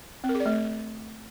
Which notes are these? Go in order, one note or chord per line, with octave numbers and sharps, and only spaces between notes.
C4
A#4
G#4
D5
A3